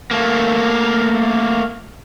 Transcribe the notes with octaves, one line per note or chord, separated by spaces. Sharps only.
A3 A#3